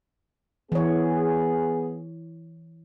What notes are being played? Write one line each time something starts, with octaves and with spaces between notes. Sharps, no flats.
E3 B3 G#4 C#5